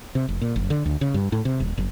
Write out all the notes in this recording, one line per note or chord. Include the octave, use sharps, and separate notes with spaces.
C3
F1
A#2
F#1
D3
D2
C#3
G2
A2
C3
D#1
F#1